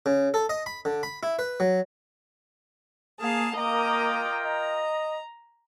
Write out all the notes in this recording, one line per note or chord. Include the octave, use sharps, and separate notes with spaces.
C#3
A4
D#5
B5
D3
B5
E4
B4
F#3
A#3 G#4 F5 A5
A#3 F4 A#4 D#5 G5 A#5 D6
D#5 A#5